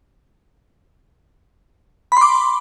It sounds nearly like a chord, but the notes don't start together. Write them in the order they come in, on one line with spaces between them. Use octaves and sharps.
B5 C6 D6